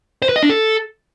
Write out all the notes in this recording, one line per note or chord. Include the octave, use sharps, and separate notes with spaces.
C5
B4
D#5
D4
A4